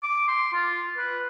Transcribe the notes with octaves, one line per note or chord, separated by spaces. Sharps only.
D6
C6
F4
B4